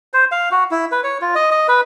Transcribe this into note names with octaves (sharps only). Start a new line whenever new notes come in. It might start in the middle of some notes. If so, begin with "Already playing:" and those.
C5
F5
F#4
E4
B4
C#5
F4
D#5
D#5
B4